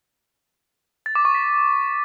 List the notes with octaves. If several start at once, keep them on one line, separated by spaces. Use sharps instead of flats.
A6
D6
C#6
B6